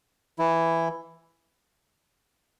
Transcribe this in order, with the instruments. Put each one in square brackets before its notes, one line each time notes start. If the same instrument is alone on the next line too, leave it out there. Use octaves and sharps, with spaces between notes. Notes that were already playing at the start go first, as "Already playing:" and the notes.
[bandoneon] E3 E4